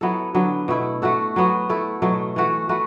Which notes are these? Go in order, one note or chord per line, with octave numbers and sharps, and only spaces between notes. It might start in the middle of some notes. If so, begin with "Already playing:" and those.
F#3 B3 E4 A4
D3 F#3 B3
B2 A3 E4
A3 F#4 A4
F#3 B3 F#4
A3 E4 A4
B2 F#3 A3
E3 A3 F#4
A3 F#4 B4